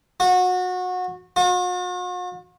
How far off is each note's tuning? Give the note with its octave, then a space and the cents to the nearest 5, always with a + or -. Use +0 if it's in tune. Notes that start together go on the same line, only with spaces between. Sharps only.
F#4 -25
F#4 -45